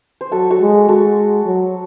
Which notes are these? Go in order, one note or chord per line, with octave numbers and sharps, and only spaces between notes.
C5
F#3 F#4 A4
F#4 A4
G#3
G#3 F#4 A4
F#3